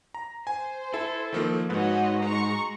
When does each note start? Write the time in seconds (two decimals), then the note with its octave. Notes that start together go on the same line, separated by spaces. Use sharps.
0.14 A#5
0.47 C5 G#5
0.94 E4 A4
1.33 D#3 F3 A#3
1.70 G#2 F#4 B4 C#5 D#5
2.22 G#3 A#5 C#6